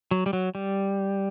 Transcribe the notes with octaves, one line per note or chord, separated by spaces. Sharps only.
F#3
G3
F#3
G3